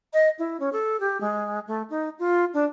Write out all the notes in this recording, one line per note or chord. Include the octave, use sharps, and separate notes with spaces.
D#5
E4
C#4
A4
G4
G#3
A3
D#4
F4
D4